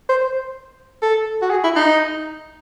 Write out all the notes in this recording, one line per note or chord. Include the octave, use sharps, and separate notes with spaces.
C5
A4
F#4
G#4
E4
D#4